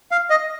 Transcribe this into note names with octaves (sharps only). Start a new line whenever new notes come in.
F5
D#5